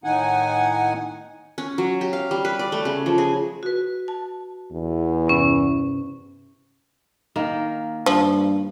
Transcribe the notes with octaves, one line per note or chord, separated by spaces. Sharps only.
A2 D#3 D#4 F#5 G#5
C#4
F#3
G4
F5
G3
B4
D5
A3
C#3
F3
G#4
F#4 B4
A5
E2
G2 C3 C#4
D#3 A#3
G2 F3